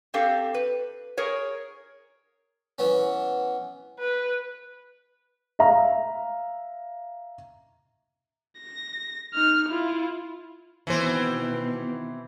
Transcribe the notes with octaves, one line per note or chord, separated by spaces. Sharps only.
C4 D4 G4 A4 F5
B4
G#4 A#4 C#5
E3 B3 C#4
B4
E5 F5 A#5
A#6
D#4 F6
E4 F4
B2 D#3 E3 C4 E4 C5